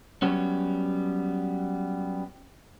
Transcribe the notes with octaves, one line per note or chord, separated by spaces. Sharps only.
F#3 G3 B3 C#4